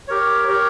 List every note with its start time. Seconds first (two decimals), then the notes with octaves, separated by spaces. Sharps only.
0.08 G4 A#4 C#5
0.47 G4 A#4 C#5